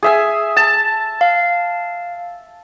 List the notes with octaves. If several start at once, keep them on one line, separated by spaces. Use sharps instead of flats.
G#4 E5 G#5
A5
F5